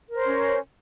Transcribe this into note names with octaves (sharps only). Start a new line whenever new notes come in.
C#4 A#4 C5 C#5